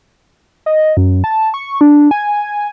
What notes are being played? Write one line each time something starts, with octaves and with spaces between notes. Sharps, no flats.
D#5
F#2
A5
C#6
D4
G#5